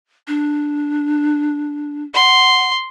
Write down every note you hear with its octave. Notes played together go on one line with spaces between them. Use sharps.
D4
F#5 C6